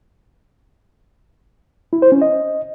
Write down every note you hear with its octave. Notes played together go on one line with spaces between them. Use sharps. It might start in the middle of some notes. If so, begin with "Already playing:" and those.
E4
C5
C#4
D#5